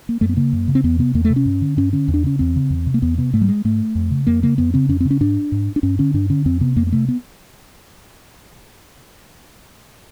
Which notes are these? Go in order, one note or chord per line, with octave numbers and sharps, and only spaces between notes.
A#3
F#2 A3
B3
C#3 A#3
F#2
C#3
C4
E2 B3
C3 B3
E2 A#3
A3
C3
C#4
G2
D3
G2 C#4
D3 C#4
E2
D4
C#3 C#4
E2 C4
C#3
E2
C3
A#3
E2 B3
C3 B3
G#2 A3
G3
G#3
G#2 A3
F2
C#3
F2 A#3
C#3 A#3
F2 B3
C#3 C4
F2 C#4
C4
C#3
C#4
G#2 D4
G#2
D4
G2 C#4
D3 C#4
G2 D4
D3 C#4
F2 C4
C3 B3
F2 A#3
A#3
C3 A3
B3